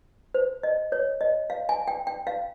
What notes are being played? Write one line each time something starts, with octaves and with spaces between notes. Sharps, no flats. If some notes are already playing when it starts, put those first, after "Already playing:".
C5
D#5
C#5
D#5
F5
G#5
G5
G5
F5